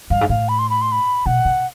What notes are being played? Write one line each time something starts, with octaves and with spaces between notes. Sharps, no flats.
G2 F5
G#2
A2 F5
B5
C6
B5
C6
B5
B2 F#5
C3